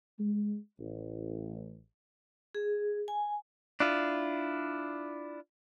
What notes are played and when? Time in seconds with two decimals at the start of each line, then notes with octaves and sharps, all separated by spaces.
0.19 G#3
0.80 A1
2.55 G#4
3.08 G#5
3.80 D4 E4 F4